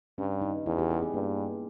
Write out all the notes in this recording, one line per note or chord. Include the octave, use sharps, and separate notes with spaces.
G2 C#4
D#4
E2 E4
G4
G#4
B3
G2 A#3